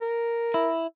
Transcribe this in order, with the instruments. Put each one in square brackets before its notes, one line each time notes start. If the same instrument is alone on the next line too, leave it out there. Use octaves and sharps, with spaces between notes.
[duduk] A#4
[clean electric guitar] E4